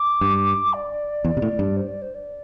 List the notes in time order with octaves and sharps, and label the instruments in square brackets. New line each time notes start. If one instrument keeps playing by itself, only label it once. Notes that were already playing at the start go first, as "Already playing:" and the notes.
Already playing: [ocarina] D6
[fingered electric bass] G2
[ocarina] D5
[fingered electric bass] E2
C3
A2
G2
[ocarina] C5
D5
C5
D5